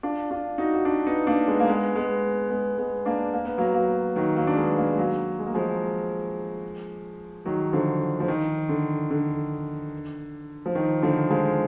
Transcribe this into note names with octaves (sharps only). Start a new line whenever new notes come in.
D4 F4
D4 F4
D#4 F#4
F#4
D4 F4
B3 D#4
A#3 D4
G#3 B3
A#3
G#3 B3
G#3 B3
G#3 B3
G#3 B3
A#3 D4
A#3
B3
F#3 A#3
F#3 A#3
D#3 F#3
F#3 A#3
D4
G#3 B3
A#3 D4
G#3
F#3 A#3
G#3
A#3
F3 G#3
D#3 F#3
D3 F3
F3
D#3
D3
D3
F3
D#3
D3 F3
F3 G#3